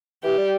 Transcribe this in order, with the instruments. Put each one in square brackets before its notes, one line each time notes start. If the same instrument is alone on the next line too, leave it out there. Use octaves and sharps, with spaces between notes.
[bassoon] E3 [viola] G4
[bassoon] G3